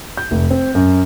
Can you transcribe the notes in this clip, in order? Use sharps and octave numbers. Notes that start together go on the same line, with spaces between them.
G6
F1
C4
F#2